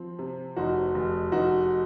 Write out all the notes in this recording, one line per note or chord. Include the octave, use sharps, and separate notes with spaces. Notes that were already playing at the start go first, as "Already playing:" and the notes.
Already playing: F3 C4
C3
F1 D#4 F#4
F1
F1 D#4 F#4